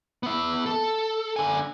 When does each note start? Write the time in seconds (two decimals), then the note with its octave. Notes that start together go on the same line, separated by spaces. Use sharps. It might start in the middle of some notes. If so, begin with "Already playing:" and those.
0.23 B3 E5
0.66 A4
1.36 D3 G#5